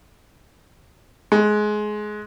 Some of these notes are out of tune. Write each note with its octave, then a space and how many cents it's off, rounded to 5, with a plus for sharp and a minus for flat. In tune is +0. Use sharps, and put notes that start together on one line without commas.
G#3 +20